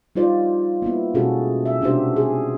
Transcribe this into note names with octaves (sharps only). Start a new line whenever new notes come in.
G3 D#4 F4 C5 D5
A#3 B3 E4
B2 G#3 C#4 F#4 G#4 A4
E5
C3 C#4 D4 F#4 G4 C5
G#4